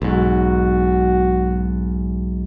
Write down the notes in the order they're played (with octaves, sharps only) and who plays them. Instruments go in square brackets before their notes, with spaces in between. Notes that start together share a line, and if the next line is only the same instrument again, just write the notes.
[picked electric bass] B1 G#2 [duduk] F#4